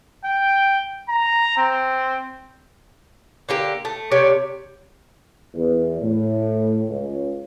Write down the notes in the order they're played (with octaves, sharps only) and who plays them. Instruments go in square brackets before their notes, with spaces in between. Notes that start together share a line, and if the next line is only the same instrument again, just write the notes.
[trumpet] G5
A#5
C4
[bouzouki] D3 A#3 G4
A3
C3 G4 C#5 D5
[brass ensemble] E2
A2
C#2